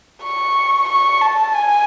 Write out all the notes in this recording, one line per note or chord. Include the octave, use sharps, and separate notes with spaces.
C#6
C#6
A5
G#5